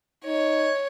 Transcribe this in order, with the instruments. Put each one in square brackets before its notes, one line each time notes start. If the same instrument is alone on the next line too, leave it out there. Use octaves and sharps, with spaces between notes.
[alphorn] D#4 [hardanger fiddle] C#5